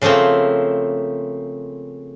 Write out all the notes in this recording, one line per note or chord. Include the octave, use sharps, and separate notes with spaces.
C#3 F3 A3 A#3 C4